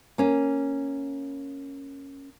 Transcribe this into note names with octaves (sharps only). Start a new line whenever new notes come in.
A#3 C#4